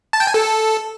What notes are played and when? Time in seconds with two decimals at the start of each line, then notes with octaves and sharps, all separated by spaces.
0.13 A5
0.20 G5
0.27 G#5
0.34 A4